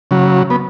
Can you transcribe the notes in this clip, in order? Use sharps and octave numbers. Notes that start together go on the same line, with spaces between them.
C#3 F#3
B3